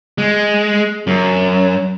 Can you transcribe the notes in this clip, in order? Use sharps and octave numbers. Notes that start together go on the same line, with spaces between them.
G#3
F#2